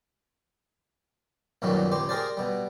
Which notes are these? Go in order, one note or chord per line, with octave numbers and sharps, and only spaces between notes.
B1 F#2 A#2 D#3 F#3 G3
C#2 G4 C5
G4 G#4 A#4 C5 D5
B2 G3